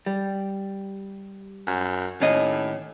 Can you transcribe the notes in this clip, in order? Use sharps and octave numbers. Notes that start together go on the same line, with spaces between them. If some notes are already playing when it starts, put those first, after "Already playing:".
G3
F#2
D#2 A2 C#4 D#5